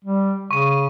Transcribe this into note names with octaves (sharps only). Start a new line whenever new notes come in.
G3
C#3 C#6 D#7